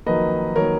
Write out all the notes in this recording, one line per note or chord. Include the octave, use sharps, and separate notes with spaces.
F2 D#3 F#3 A#3 B4 D#5
D#3 F#3 A#3 A#4 C#5